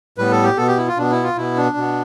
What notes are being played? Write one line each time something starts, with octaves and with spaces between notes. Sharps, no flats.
A2 G3 B3 B4
A4
G4
B2 B3 A4
G4
E4
F4
B2 B3 D4
E4
F4
B2 B3 E4
D4
B2 B3